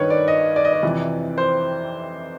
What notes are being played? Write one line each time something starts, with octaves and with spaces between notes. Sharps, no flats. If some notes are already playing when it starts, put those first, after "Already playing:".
Already playing: G2 D#3 B4 C#5
D5
D#5
D5
D#5
D5
F2 C3 E3
C5